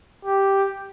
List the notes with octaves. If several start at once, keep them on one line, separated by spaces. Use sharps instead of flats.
G4